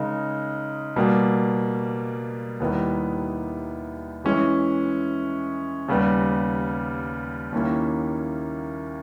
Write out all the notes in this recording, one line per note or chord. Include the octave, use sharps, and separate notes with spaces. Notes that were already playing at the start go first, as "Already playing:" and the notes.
Already playing: C#3 G#3 D#4 A#4
B2 G3 A#3
D#2 D#3 G3 B3 E4
E3 G#3 C#4 E4
D#2 C#3 G3 B3
D#2 D#3 A#3 C#4 E4